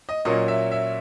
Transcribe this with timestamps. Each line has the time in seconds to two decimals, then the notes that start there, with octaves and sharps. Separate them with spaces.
0.09 D#5
0.25 A#2 F#3 A#3 C#4 D#5
0.48 E5
0.72 E5